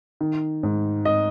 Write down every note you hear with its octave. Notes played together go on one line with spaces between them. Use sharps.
D#3
G#2
D#5